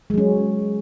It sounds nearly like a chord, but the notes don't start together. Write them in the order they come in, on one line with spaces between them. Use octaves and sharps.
G#3 F#3 C#4